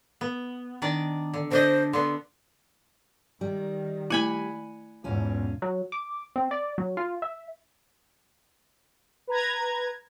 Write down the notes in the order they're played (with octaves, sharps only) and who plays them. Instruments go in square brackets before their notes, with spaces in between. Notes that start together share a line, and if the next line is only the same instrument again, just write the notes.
[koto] B3
D#3 D4 D5
D3
[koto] D3 D4 D#5 [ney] C5
[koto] D3 B3 [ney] C6
[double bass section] D#3 [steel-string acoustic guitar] G3
[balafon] A3 E4 [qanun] F#5 G#5 B5
[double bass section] E2 G#2 B2 [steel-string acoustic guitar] C#4 F4
[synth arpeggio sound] F#3
D6
C4
D5
F#3
F4
E5
[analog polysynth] B4 A#5 G#6